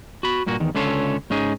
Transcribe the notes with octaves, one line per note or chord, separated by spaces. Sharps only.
F#4 B5
G2 A#2 A#3 F#4
E2 D#3
C#2 D3 C#4 F4 A4 C#5
G#2 C#4 D#4 G#4